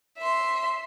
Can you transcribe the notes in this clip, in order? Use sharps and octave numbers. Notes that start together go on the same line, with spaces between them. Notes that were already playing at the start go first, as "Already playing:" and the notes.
E5 C6